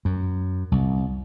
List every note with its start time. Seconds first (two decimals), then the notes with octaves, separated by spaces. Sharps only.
0.05 F#2
0.72 C2